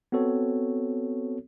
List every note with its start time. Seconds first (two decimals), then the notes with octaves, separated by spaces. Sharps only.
0.12 B3 C4 F#4 A4 C#5